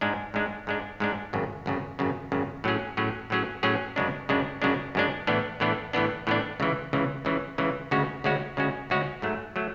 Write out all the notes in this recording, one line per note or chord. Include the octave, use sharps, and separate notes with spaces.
G#2 G#3 D4
G#2 G#3 D4
G#2 G#3 D4
G#2 G#3 D4
G#1 F#2 C#3
G#1 F#2 C#3
G#1 F#2 C#3
G#1 F#2 C#3
A2 F#3 C#4 G#4
A2 F#3 C#4 G#4
A2 F#3 C#4 G#4
A2 F#3 C#4 G#4
F#2 C#3 G#3 D4
F#2 C#3 G#3 D4
F#2 C#3 G#3 D4
F#2 C#3 G#3 D4
A2 E3 B3 D4
A2 E3 B3 D4
A2 E3 B3 D4
A2 E3 B3 D4
C#2 C#3 E3
C#2 C#3 E3
C#2 C#3 E3
C#2 C#3 E3
D2 C#3 G#3 C#4 F#4
D2 C#3 G#3 C#4 F#4
D2 C#3 G#3 C#4 F#4
D2 C#3 G#3 C#4 F#4
G#2 F#3 A3
F#3 A3